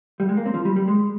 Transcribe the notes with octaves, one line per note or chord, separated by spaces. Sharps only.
G3
G#3
A#3
C4
F3
G3
G3
G#3